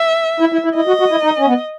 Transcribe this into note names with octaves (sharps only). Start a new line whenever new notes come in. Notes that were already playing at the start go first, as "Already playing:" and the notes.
Already playing: E5
E4
E4
E4
E4 D#5
F#4
F#4
E4
D#4
C#4
B3